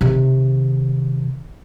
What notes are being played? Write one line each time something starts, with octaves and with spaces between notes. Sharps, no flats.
C3 D#3